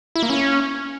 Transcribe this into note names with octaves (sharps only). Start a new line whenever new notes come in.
E4
A#3
C#4